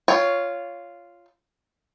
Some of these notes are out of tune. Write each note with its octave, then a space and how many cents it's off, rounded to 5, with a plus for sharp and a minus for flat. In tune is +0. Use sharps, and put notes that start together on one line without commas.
F4 -5 C#5 +10 G5 +25